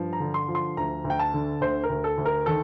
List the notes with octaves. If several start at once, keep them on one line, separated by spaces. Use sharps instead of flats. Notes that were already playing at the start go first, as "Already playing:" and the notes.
Already playing: G2 F3
A#5
D3
C6
F3
C6
D2 A#5
D2
G5
A5
D3
D2 C5
A#4
D2
A4
D2
A#4
D#3 A4